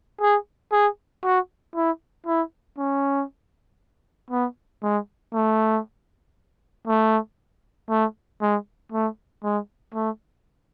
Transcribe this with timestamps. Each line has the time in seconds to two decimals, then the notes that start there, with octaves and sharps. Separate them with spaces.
0.21 G#4
0.72 G#4
1.24 F#4
1.76 E4
2.26 E4
2.78 C#4
4.31 B3
4.83 G#3
5.34 A3
6.87 A3
7.90 A3
8.41 G#3
8.92 A3
9.43 G#3
9.94 A3